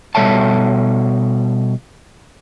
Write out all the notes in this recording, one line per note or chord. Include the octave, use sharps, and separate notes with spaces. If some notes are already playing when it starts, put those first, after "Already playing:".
B2 G3 A4 C#5 E5 A5